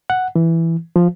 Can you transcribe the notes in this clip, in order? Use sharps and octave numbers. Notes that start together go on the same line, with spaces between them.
F#5
E3
F3